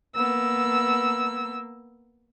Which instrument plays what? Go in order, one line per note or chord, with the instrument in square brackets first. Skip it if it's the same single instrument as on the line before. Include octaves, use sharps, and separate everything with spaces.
[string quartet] A#3 B3 E6